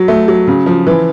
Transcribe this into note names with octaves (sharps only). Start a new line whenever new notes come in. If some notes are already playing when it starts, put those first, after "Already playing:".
Already playing: F#3
A3
F#3
C#3
F3
E3